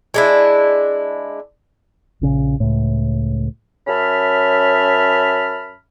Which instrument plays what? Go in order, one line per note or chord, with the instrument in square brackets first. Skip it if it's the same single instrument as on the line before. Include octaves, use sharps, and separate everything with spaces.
[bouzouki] G#3 D4 E4
[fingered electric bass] A#1 C#3
C#2 A2
[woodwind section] F#2 C#4 E5 A5 B5 F6